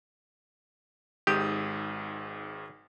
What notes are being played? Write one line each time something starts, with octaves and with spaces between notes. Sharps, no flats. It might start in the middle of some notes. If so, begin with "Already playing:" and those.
G#1 G#2 G4 D#6